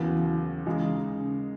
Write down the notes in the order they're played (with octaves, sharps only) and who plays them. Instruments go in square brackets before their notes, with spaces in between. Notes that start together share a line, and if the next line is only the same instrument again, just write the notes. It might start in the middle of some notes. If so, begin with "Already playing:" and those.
Already playing: [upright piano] D#2 C#3 F#3 B3 [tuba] E3
[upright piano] C#3 G#3 D#4 [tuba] E3
[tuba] C#3